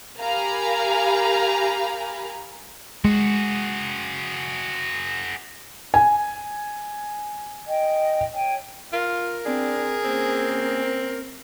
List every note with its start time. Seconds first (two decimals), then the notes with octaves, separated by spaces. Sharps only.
0.20 G4 A#4 F5 G#5 A#5 B5
3.05 G#3 F#4 G#4
5.94 G#5
7.67 D#5 G5
8.33 C#5 G5 G#5
8.93 F4 A#4
9.46 C4 D4 G#4
10.04 A#3 C4 C#4